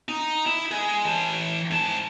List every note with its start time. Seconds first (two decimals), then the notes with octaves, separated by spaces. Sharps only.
0.09 D#4
0.46 E4
0.71 G#4 D#5
1.05 E3 A5
1.71 G#2 A5